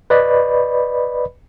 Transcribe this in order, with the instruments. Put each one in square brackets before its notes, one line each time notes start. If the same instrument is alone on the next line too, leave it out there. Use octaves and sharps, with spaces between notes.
[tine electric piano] B4 D5 D#5 B5